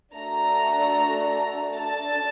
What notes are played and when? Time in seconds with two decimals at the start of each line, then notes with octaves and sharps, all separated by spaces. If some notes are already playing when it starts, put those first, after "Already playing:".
0.14 A3 D4 F#4 A4 A#5
1.75 D4 A4 A5